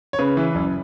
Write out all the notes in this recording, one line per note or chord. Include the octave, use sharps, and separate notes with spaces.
C#5
C#3 B4
E3
F#1